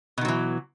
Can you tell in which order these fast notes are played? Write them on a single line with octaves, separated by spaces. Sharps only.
B2 D#3 F#3 E3